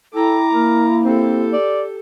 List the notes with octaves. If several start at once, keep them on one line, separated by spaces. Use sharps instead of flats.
E4 A4 G5 A#5 D6
A#3 A#4
C4 G4 A4
D5